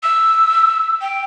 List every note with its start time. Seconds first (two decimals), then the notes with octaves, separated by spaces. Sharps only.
0.03 E6
1.01 G5